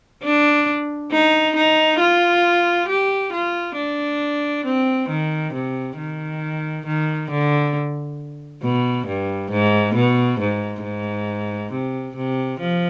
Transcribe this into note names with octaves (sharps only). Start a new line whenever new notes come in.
D4
D#4
D#4
F4
G4
F4
D4
C4
D#3
C3
D#3
D#3
D3
B2
G2
G#2
B2
G#2
G#2
C3
C3
F3